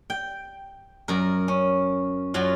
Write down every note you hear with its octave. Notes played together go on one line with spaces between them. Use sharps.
G5
F#2 A#4
C#4
F#2 F#3 F4